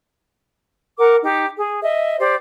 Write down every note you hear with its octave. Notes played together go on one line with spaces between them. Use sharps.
A#4 F#5 D6
D#4 G4
G#4
D#5 E5
G4 C5 D5